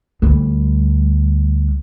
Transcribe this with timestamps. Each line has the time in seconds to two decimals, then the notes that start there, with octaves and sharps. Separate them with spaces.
0.22 D2 G3